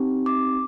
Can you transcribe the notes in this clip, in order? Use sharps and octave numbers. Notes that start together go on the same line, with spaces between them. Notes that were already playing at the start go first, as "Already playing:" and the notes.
Already playing: C4 D#4 G4
D6